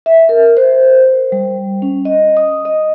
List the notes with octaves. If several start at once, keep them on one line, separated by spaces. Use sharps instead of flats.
E5
A#4
C5
G3
C#4
D#5
D#6
D#5